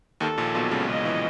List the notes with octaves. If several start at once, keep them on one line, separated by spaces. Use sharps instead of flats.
D#2 D#3 A4
A#1 A#2
B1 B2
C#2 C#3
C#2 C#3 D#5
E3